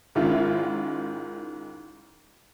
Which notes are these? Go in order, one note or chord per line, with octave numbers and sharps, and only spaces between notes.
G#2 D#3 C#4 E4 F4